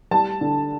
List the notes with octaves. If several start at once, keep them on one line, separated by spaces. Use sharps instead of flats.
G3 A5
D3